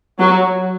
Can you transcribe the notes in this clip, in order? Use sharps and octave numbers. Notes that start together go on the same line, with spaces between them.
F#3